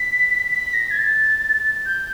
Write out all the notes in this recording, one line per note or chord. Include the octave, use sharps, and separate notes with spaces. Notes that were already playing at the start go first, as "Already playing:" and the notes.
Already playing: B6
B6
A#6
G#6
A6
G6